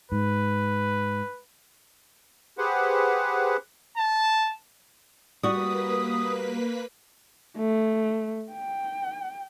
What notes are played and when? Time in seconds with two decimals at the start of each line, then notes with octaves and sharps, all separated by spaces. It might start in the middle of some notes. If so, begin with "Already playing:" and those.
0.12 G#2 B4
2.58 G4 G#4 B4 C5 F#5
3.97 A5
5.43 G3 A#3 F#4 B4 D#6 B6
7.57 A3
8.53 G5